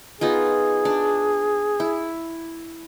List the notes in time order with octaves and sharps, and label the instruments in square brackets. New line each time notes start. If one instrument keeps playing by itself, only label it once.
[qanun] B3 D#4 F4 [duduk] G#4
[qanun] D4
E4